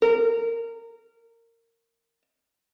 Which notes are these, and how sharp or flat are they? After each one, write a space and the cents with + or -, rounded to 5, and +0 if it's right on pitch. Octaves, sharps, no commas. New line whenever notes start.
A#4 -20